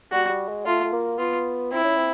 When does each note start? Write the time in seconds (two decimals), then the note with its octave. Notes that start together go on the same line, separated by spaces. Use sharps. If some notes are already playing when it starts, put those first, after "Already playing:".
0.11 G3 F#4
0.29 G3
0.48 G#3
0.66 A3 F4
0.84 A3
0.92 A#3
1.19 B3 F4
1.72 C4 E4
1.84 C#4
1.96 C4